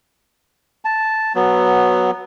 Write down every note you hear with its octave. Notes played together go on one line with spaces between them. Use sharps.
A5
F#3 B3